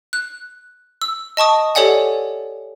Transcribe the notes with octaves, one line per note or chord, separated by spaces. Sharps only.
F#6
E6
D#5 A5 C#6 D#6
G4 A4 C#5 D5 F#5 G#5